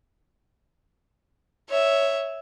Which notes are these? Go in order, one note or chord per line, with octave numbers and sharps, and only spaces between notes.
C#5 E5